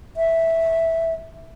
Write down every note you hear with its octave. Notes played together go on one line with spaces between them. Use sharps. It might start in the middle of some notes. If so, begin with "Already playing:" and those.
E5